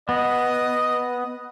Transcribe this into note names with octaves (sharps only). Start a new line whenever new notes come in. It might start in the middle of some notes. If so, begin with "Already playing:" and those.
B3 D#5